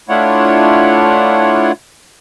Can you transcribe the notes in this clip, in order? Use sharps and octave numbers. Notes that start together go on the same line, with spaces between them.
A3 D4 E4 F4 C#5 F#5